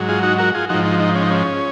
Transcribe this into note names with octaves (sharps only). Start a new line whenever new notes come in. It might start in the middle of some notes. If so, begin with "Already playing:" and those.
Already playing: G#2 F#3
F4 G#4
D#4 F#4
F#4 A#4
F4 G#4
G#2 F3 D#4 F#4
D#4
D#4
C#4
D#4
C#4